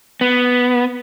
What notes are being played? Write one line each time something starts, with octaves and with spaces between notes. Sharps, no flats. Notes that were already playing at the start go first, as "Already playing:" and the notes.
B3